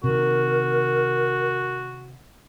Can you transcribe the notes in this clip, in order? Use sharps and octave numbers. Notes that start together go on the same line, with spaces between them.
C3 D#3 F#4 A#4